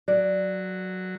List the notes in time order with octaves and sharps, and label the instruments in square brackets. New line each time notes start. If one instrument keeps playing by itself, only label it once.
[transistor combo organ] F#3 [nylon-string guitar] D5